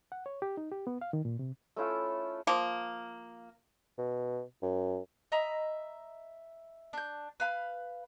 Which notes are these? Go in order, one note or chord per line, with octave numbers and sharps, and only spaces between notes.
F#5
C#5
G4
D#4
G4
B3
F5
D#3
A#2
C3
A3 C#4 E4 F4
F3 A#3
B2
F#2
D#5 E5 A#5 B5
D4 G6
B4 F5 B5